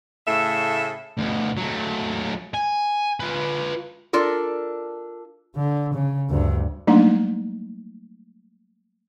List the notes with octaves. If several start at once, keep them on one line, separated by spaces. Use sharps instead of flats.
A2 C#3 A3 A4 E5
D2 B2
F#3 A3
G#5
F4 B4
D4 F4 A4 A#4
D3
C#3
D2 G2
F#3 G3 A3 A#3 D4 D#4